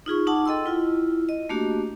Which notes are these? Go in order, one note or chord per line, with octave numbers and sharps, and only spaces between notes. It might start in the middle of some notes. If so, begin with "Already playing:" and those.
D#4 F4 G#4 C#6
D#4 F#5 A5 D6
A4 D#5 G5 C6 E6
E4 F4
D#5
A3 A#3 D4 F#4 G4